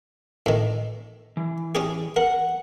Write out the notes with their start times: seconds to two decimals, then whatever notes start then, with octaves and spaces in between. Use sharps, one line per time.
0.46 A2 D#3
1.37 E3
1.75 C#4 G4 G#4
2.16 A#4 F#5